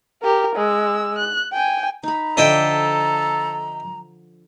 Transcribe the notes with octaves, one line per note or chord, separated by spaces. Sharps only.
G4 A#4
G#3 E6
F#6
G5 G#5
D#4 A#5 B5
D3 F3 D4 A4 D#5 E5 G5